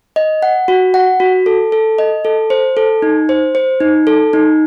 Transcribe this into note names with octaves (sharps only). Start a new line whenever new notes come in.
D#5
F#5
F#4
F#5
F#4
A4
A4
D#5
A4
C5
A4
D#4
C5
C5
D#4
A4
D#4